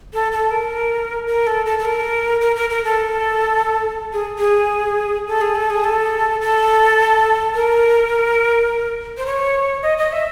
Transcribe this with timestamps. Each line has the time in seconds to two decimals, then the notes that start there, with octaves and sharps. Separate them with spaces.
0.13 A4
0.32 A4
0.50 A#4
1.27 A#4
1.47 A4
1.66 A4
1.79 A4
1.85 A#4
2.41 A#4
2.56 A#4
2.70 A#4
2.84 A4
4.13 G#4
4.38 G#4
5.27 A4
5.41 G#4
5.55 A4
5.70 G#4
5.84 A4
6.41 A4
7.54 A#4
9.18 C5
9.26 C#5
9.83 D#5
9.98 D#5
10.12 E5